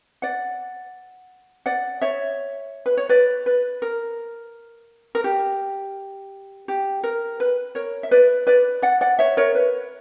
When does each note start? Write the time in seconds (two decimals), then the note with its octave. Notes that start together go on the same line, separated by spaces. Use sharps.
0.22 D5 F#5
1.66 D5 F#5
2.02 C#5 E5
2.86 B4
2.97 C#5
3.09 B4 D5
3.46 B4
3.82 A#4
5.15 A#4
5.24 G4
6.68 G4
7.04 A#4
7.40 B4
7.75 A#4 C#5
8.03 E5
8.11 B4 D5
8.47 B4 D5
8.82 D5 F#5
9.01 D5 F#5
9.19 C#5 E5
9.37 A#4 C#5
9.55 B4